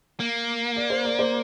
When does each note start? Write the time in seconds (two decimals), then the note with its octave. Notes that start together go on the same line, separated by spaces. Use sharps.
0.20 A#3
0.76 D5
0.90 C5
1.05 D5
1.19 C5